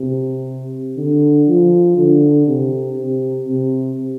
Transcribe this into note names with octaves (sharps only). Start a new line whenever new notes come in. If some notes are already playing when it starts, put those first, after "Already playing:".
Already playing: C3
D3
F3
D3
C3
C3
C3